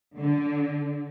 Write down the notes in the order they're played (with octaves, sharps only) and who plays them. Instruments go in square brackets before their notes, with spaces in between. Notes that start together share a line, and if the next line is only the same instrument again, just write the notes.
[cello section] D3